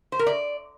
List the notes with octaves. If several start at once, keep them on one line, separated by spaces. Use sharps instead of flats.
C5
A#4
D5